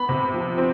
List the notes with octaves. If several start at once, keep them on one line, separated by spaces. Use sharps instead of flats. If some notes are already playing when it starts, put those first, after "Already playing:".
Already playing: B3 B5
C3
F3
C4